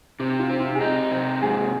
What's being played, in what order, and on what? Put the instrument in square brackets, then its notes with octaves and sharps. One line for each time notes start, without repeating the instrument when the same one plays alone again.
[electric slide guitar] C3 [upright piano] G4
[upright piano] F4
[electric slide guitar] C4
[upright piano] F4
G#4
[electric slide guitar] D#4 [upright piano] G4
[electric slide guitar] C3
[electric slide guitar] G#2 [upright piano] G#4